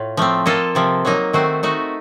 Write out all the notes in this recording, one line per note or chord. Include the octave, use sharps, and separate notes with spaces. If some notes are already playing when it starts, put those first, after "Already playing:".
Already playing: A2 F4
F3 A3 C4
A#3 F4 A4 D#5
C3 F3 C4
F#3 A#3 D#4
D#3 A3 C4 F#4 C5
A3 D#4 F#4